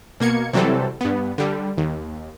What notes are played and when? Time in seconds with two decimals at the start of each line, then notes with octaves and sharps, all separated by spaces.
0.20 B2 A#3 G#6 C#7
0.53 C3 E3 F#3 G3 C4 A4
1.01 G2 B3
1.38 D3 G3
1.78 D#2